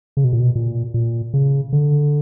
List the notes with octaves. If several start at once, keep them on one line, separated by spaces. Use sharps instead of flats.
C#3
B2
A#2
B2
A#2
A#2
C#3
D3